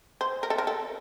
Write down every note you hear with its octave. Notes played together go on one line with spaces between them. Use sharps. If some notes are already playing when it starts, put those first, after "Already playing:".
C5
A#4
A4
A#4
A4